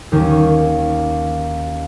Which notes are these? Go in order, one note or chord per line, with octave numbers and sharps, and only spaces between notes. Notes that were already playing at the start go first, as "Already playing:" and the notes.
D#2 D#3 A#3 C#4